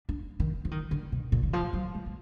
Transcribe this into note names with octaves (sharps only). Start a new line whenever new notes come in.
D4
D#3
F3
D#3
D3
B2
A#2
D#3
F3
F#3
G#3
A#3